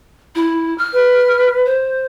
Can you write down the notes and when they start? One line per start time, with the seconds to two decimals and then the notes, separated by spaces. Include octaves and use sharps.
0.35 E4
0.78 F6
0.94 B4
1.65 C5